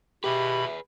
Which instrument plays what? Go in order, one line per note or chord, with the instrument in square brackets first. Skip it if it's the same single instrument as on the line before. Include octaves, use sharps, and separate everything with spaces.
[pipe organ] B2 B5 [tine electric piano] G4 [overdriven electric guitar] G#4 B4 [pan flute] E5